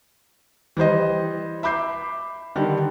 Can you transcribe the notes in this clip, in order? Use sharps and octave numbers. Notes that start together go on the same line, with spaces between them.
E3 G3 C5 D#5
E5 B5 D6 G6 C7
D3 D#3 G3